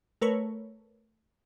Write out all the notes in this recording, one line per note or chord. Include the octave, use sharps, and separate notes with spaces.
A3 A#4 B4 C#5